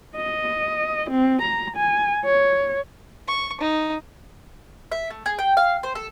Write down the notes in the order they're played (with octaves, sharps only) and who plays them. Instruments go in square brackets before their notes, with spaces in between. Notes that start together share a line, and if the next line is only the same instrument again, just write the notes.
[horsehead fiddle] D#5
C4
A#5
G#5
C#5
[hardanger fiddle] C#6
D#4
[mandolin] E5
A3
G#4
G5
F5
C5
A4